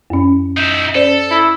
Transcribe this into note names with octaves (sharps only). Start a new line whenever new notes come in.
F#2 C#4
D#4 E5
C#4 A4 C5 D5
E4